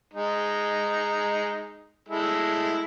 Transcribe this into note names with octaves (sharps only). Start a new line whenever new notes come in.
G#3 D#4
G#3 E4 A4